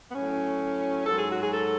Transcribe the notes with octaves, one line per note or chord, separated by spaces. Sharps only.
B3
A2 F#3 C#4
G#2 F#3 A4
G#4
F#4
G#4
A4